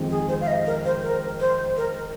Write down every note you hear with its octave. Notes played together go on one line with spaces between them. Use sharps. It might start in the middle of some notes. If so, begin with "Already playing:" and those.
Already playing: F2 D#3 G#3 C4
G#4
C5
F5
D#5
A#4
C5
A#4
C5
A#4